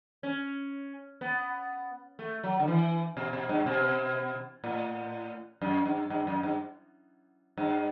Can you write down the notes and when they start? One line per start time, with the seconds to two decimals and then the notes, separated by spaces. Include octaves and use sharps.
0.23 C#4
1.21 B3
2.19 A3
2.43 F#3
2.60 D3
2.68 E3
3.17 B2
3.33 B2
3.49 G2
3.66 B2
4.64 A2
5.61 F#2
5.86 G2
6.10 G2
6.27 F#2
6.43 G2
7.57 G2